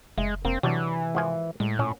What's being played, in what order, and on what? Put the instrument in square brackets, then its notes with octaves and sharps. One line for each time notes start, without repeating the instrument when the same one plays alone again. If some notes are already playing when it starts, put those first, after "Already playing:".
[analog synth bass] F#1 [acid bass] G#3 [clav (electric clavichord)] E5
[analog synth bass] F1 [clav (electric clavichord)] A#3 [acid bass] C4
[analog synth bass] C3 [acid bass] E3 [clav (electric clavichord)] F#3 G3 D4
[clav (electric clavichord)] G#1 F3 G#5
[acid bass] A2 [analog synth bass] G#3
[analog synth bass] A#2 [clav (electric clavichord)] C#4